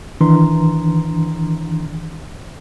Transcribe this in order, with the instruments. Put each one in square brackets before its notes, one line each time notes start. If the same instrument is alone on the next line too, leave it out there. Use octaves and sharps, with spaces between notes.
[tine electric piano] D#3 E3 D4 A#5 C6